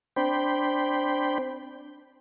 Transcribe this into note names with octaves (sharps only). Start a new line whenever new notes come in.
C4 D4 C5 G5 B5